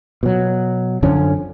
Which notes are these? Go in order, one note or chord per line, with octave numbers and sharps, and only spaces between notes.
B2 F#3
F#2 D3 F3 C#4